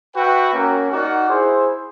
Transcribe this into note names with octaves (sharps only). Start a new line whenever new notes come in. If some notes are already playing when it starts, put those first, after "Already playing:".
F#4 B4 E5 G5
A#3 C#4 F#4 A#4
D#4 F#4 A#4 D5 F#5
E4 G#4 C5